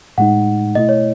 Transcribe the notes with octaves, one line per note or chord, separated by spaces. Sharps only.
A2 G#3 D#4 F#5
B2 A3 E4 D#5
C#5